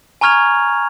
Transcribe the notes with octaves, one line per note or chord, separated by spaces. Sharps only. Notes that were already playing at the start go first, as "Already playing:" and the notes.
G#5 A#5 C#6 F6 G#6 F7